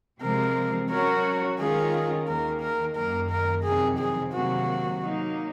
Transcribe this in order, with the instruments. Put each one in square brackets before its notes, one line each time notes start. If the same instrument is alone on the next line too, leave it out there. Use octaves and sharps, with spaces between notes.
[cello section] C3 F3 G#3 C4 [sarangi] A#4
[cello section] F#3 C#4 F#4 C#5 [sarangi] A#4
[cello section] D#3 G#3 C#4 F4 A#4 [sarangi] G#4
[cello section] D#2 D#3 A#3 [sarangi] A#4
[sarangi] A#4
[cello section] F#2 D#3 A#3 [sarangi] A#4
[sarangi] A#4
[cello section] F2 C3 D#3 F#3 C4 [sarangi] G#4
[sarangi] G#4
[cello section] C3 D#3 F#3 A#3 [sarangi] F#4
[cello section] F#3 A#3 D#4